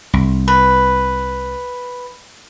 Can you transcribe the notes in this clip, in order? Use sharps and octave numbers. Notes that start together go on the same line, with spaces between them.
C2
B4